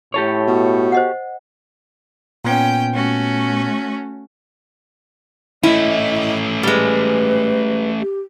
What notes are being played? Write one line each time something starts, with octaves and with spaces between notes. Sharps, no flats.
A2 G4 A4 C#5
B2
C5 D#5 F#5
A#2 B3 C#4 G5
A3 C#4 F#4
A3 C#4 E4 D#5
G3 G#3 B4
G4